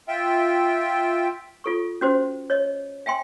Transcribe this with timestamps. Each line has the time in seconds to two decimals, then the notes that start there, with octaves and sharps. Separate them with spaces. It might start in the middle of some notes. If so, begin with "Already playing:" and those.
0.08 F4 E5 G5
1.64 F4 A4 C#6
2.01 C#4 F#4 C5
2.50 C#5 D#5
3.06 E5 G5 G#5 C6